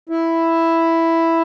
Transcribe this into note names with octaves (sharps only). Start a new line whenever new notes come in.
E4